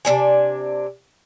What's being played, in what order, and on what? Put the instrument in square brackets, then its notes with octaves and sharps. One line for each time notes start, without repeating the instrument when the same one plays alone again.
[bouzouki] C3 C4 D4 G#5